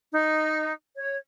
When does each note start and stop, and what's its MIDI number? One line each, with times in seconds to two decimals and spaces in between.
0.13 0.72 63
0.97 1.15 73